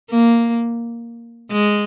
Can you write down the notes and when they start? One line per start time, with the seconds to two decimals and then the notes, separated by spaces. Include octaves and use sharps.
0.10 A#3
1.51 G#3